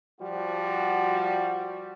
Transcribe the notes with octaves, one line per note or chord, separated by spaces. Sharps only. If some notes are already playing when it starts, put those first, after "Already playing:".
F3 G3 F#4